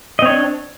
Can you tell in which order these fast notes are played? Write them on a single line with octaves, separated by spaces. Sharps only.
D#5 C4 C#5 D4